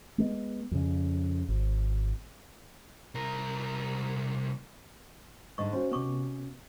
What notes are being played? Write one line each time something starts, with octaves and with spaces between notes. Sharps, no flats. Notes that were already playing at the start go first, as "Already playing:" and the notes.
G#3 A3 B3
F2 C#3
G#1
C2 A#4
G#2 D3 G#3 D#5 C#6
C#4 F#4 C5
C3 B3 B4 C#6 D6